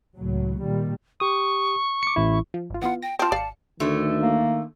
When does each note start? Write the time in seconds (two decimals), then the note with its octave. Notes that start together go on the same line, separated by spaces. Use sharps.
0.16 C#2 A2 F#3
0.62 A#2 D#3 G3
1.20 G4 C#6 D#6
2.03 D6 C#7
2.16 A1 E4
2.54 F3
2.70 G#1 F4
2.82 E3 B3 F4 F#5
3.02 G5 A#6
3.19 C4 F4 A5
3.32 G#1 D5 F5 C#7
3.80 D2 A2 D3 D#3 A3
4.22 A#3